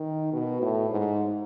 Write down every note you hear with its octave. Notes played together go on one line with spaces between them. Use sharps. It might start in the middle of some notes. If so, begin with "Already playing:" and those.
Already playing: D#3
B2
A2
G#2